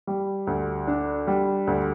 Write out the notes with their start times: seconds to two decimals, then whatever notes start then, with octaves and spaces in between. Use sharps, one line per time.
0.07 G3
0.47 D2
0.87 D4
1.27 G3
1.67 D2